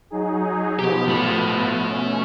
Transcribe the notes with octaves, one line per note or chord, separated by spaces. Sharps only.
F#3 D#4 G#4
B2 F3 B3 G4
A3 B5
B2 C#4